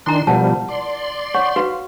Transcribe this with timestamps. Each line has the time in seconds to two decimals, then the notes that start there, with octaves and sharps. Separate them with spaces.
0.06 D#3 D4 E4 A#5 C6
0.27 B2 F3 G3 A#4 F#5 A5
0.68 D5 C6
1.35 C#5 F#5 C#6
1.56 F#4 B4 F5